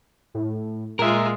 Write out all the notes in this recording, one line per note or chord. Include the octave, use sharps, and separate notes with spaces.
A2
A#2 G#3 F4 A#4 E5